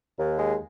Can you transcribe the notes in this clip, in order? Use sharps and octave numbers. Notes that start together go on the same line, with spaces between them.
D#2
G#3